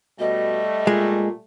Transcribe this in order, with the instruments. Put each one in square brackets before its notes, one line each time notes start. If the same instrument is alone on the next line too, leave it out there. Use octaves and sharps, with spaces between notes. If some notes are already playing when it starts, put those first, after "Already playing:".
[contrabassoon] B2 [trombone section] G3 A3 [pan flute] D#5
[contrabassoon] A#2 [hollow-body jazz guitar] G#3